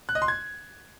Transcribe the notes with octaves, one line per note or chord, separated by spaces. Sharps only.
F#6
D#5
C6
G#6